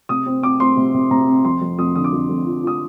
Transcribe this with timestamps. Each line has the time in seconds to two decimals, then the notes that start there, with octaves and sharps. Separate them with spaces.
0.09 C3 D#6
0.26 C4
0.43 C4 D6
0.60 C4 C6
0.77 C3
0.94 C3
1.11 C3 A#5
1.28 C4
1.44 F2 C6
1.61 F2
1.78 F2 D#6
1.95 D3 D#6
2.04 D6
2.13 F2
2.29 F2
2.46 F3
2.63 F3 D#6